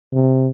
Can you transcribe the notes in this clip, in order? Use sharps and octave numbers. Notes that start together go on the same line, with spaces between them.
C3